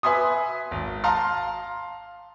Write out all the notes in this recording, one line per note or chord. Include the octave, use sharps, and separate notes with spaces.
B4 E5 G#5 C6 D#6
G#1
F5 A5 A#5 C6